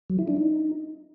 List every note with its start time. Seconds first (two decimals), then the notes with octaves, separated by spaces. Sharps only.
0.10 F#3
0.19 E4
0.28 D4
0.37 D#4